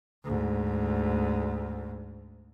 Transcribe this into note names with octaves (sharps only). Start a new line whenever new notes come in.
D2 G#2